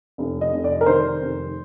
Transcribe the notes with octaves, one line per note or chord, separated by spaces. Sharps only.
F1
D#5
F1
D5
A#4
D#3 C5
F1